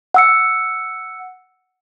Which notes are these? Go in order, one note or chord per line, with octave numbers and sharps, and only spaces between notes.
F#5 E6 C#7